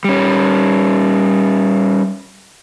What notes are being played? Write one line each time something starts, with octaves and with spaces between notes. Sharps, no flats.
G3 C#4